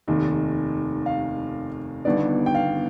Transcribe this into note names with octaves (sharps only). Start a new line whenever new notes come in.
F1 D#2 D#3
F5
G1 G2 D#3 B3 D5
G5
F5